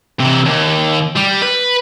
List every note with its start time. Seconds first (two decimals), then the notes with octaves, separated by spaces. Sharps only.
0.20 C3 E3
0.46 D#2
1.16 G3
1.42 B4